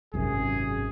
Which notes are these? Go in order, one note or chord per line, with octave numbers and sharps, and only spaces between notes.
G#1 F#2 C3 G#4